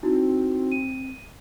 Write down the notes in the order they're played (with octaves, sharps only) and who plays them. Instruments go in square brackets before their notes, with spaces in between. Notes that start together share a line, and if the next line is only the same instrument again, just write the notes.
[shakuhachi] C4 [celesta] D#4 E4 F#4
[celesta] D#7